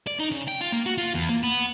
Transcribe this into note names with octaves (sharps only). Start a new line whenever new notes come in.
D5
D#4
C#3
G5
F4
A#3
F#4
F4
E2
A#3
B3